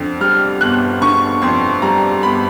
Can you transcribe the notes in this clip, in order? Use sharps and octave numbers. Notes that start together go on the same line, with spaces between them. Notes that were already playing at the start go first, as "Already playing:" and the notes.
Already playing: F2 D3
G3 F6
G1 F#6
D3 C#6
F2 C6
G3 A#5
G1 B5